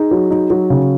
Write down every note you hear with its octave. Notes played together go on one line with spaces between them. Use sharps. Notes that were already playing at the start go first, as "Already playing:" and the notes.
Already playing: D#4 G#4
F#3
D#4
F#3
C#3